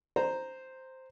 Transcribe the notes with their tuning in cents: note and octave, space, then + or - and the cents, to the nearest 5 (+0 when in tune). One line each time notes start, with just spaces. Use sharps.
C5 +0 A#5 -5